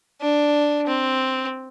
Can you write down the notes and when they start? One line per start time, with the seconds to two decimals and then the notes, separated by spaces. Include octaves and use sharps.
0.22 D4
0.87 C4